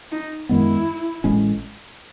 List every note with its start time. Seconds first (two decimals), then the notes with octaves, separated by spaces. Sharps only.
0.12 D#4
0.49 F#2 D#3 G#3 B3 E4
1.24 A1 A2 G#3 C#4